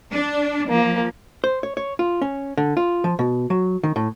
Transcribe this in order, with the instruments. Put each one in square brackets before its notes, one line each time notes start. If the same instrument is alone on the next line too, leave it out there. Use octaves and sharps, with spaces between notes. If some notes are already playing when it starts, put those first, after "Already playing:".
[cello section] D4
[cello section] F3 [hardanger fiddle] A#3
[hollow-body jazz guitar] C5
C#5
C#5
F4
C#4
D3
F4
F3
B2
F#3
D#3
A2